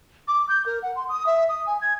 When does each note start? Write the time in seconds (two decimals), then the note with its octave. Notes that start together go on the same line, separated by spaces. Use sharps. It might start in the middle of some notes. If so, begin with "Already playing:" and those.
0.28 D6
0.49 G6
0.66 A#4
0.82 F#5
0.96 C6
1.09 D#6
1.26 E5
1.49 D#6
1.66 G#5
1.81 G#6